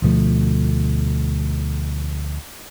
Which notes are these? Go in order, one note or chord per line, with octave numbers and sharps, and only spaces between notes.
D2 B2 F3 A3